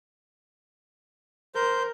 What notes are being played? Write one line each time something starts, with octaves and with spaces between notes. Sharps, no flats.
A#4 C5 G6